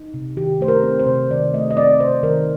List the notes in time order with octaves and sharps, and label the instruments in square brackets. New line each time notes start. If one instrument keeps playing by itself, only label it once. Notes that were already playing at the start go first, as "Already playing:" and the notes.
Already playing: [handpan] D#4
C3
D#3 G4
A3 C5
A#4
C4
C5
C3
D#3 D5
A3 D#5
D#5
C4 D5
C3 C5
D#3 A#4